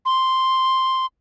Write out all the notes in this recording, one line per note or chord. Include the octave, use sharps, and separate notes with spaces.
C6